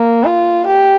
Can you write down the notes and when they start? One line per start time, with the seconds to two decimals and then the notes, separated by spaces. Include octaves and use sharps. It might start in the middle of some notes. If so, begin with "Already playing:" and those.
Already playing: A#3
0.24 F4
0.66 G4